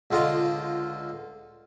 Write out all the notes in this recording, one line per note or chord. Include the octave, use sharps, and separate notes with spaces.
C#2 D3 F4 D#5 F5 C6